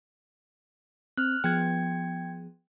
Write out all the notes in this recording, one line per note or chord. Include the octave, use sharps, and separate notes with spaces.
C4 F6 F#6
F3 B3 G#4 G5 G#6